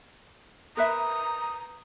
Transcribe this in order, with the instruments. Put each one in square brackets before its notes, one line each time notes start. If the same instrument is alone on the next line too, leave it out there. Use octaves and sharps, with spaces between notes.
[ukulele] A#4 B4 E5 [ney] A#5 [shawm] D#6